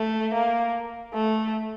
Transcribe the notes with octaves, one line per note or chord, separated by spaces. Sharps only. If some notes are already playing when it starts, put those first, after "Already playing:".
Already playing: A3
A#3
A3